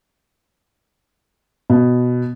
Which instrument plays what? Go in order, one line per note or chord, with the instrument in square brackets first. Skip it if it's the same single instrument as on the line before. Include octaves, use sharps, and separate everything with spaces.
[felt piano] B2